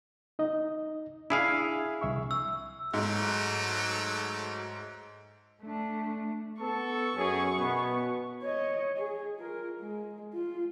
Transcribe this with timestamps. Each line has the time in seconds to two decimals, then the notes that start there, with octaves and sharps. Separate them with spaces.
0.39 D#4 D#5
1.30 D4 E4 G#4 F5
2.01 C2 E5 C#6
2.31 E6
2.94 G#2 F#3 A3
5.62 A3 D4
6.60 B3 A4 C#6
7.16 F#2 C#4 G#4
7.58 B2 B3
8.42 C#5 D#5
8.97 G#4
9.36 F4 A#4
9.80 G#3
10.34 F4